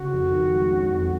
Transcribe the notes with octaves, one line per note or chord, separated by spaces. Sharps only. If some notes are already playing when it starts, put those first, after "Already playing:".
Already playing: C#3 F#4
F2
D#3
G#3
C#4
F2